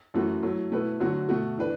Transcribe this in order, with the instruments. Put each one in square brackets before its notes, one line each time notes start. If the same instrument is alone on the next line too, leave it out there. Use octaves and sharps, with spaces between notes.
[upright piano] F#2 E3 A3 F#4
F#3 A3 E4
B2 A3 E4 B4
D3 F#3 A3 F#4
B2 A3 F#4
E3 D4 B4